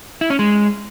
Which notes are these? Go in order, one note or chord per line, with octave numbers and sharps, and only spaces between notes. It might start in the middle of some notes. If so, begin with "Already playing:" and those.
E4
C#4
G#3